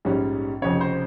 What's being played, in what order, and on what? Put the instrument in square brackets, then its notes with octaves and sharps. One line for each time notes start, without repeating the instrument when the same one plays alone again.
[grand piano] A#1 G#2 G3 C#4
F1 F2 C#3 C#5
C5